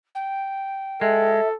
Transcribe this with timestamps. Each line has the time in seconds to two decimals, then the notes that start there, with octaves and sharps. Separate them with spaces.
0.15 G5
1.01 G#3 A4 E5